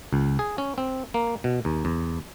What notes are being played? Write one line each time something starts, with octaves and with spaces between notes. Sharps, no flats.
C#2
G#4
C#4
C4
A#3
B2
D#2
E2